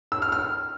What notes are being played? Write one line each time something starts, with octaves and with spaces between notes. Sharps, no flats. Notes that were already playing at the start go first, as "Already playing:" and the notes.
E6
F6
F6